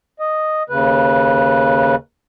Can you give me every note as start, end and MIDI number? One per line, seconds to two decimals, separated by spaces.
0.20 0.63 75
0.70 1.95 39
0.70 1.95 49
0.70 1.95 71